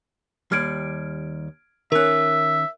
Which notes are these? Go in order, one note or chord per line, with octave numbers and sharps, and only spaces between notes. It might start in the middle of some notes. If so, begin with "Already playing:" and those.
D#2 G3 F6 G#6 D7
D#3 C#4 A#4 E5 F#6